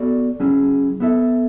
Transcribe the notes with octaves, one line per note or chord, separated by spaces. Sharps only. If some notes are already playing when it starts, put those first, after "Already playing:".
Already playing: B3 F#4 A4 D5
F#3 C#4 E4 G#4
B3 E4 A4 E5